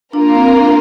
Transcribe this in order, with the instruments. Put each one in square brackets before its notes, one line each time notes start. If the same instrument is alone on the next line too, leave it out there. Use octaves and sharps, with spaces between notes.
[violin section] A#3 F4 A#4 [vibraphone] D4
[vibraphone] C4
D4